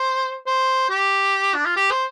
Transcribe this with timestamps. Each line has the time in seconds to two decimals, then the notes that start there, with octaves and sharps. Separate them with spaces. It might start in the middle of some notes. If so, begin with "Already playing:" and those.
Already playing: C5
0.47 C5
0.90 G4
1.54 D4
1.66 F4
1.76 G4
1.91 C5